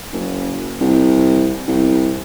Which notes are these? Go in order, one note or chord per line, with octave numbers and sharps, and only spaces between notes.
F#1
C2
C2